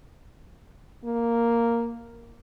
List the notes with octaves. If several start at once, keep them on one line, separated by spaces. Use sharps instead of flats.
A#3